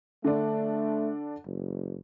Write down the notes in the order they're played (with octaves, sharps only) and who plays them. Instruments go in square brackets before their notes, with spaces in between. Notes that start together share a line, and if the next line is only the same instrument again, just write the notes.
[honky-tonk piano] D3 D4 [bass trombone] A3
[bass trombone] F#1